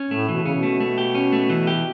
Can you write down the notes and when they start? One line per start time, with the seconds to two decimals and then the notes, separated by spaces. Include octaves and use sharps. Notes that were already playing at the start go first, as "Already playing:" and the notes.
Already playing: C#4
0.11 A2 A3
0.29 B2 E3
0.40 C#3
0.46 C#4
0.53 B2
0.63 A3
0.80 A3
0.98 G4
1.15 C#4
1.32 A3
1.50 E3
1.67 G4